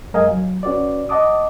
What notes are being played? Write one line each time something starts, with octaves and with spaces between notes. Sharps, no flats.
F#2 G#3 A#4 D#5 F5 G#5
F#3
C#4 F#4 B4 D5
D#5 F#5 A5 D6 D#6